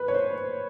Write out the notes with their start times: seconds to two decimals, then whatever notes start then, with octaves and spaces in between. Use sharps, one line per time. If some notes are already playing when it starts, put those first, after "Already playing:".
Already playing: B4
0.08 C#5
0.14 C5